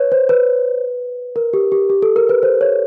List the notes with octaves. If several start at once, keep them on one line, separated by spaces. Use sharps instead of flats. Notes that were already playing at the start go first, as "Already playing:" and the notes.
Already playing: B4 C#5
C5
B4
A#4
G4
G4
G4
A4
A#4
B4
C5
C#5